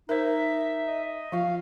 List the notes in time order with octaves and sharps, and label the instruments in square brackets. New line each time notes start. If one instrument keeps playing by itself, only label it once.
[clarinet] D#4 [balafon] A#4 C5 [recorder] E5
[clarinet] D#5
[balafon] F3 F4 [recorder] F5